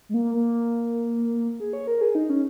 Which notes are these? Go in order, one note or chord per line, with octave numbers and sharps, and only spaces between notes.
G#3
A#3
A#3
G#4
C#5
A#4
G#4
D#4
C#4